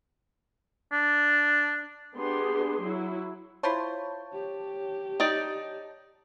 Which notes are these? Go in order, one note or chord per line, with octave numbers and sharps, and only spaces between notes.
D4
B3 D4 G4 G#4 C6
F#3 E4
E4 F4 C5 C#5 A5
G4
D#4 D5